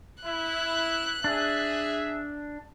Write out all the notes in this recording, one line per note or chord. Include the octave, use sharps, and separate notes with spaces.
E4 F#6
D4 G#4 E5